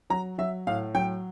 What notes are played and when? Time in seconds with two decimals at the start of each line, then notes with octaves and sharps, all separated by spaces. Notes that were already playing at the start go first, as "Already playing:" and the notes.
0.10 F#3 A#5
0.38 F#3 E5
0.67 A2 F5
0.94 F#3 G5